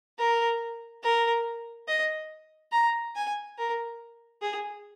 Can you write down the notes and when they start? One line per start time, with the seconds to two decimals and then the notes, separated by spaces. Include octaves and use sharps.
0.18 A#4
1.03 A#4
1.88 D#5
2.72 A#5
3.16 G#5
3.58 A#4
4.42 G#4